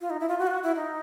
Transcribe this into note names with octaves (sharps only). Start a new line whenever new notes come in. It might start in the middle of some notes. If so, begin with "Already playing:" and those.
F4
D#4
E4
F4
F#4
F4
F#4
E4
D#4